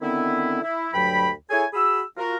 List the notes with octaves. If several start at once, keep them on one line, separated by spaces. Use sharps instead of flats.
D3 D#3 B3 C4 E4
E4
D2 G2 F#3 G5 B5
E4 G#4 A4 C#5 G#5
F#4 G#4 B5 E6
F4 F#4 A#4